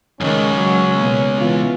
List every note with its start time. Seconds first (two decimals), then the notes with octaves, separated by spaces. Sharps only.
0.21 C#2 F#2 D#3 G#3 C#4
0.54 F#3
0.98 B2 A#3
1.37 E3 B3 F4